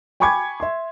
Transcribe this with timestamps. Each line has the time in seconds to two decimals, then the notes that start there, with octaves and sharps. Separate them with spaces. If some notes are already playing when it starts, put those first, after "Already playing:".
0.20 G5 G#5 B5 C#6 D6 G#6
0.60 E5 C6